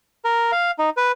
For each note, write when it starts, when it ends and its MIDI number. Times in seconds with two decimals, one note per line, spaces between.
0.24 0.52 70
0.52 0.71 77
0.79 0.90 63
0.97 1.12 71